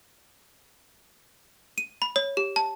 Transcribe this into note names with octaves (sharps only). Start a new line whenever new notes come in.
D#7
B5
C#5
G4
A5